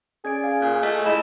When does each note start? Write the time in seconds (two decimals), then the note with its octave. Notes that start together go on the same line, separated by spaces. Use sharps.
0.25 C#4 G#4 D5 G#6 D7
0.44 F5
0.60 A#2
0.82 A3 D#5
1.06 G#3 E4 G#4 D#5 B5